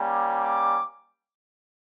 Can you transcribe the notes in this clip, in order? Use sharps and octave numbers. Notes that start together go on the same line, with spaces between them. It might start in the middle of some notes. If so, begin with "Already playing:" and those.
Already playing: G3 A#3 C#4
D6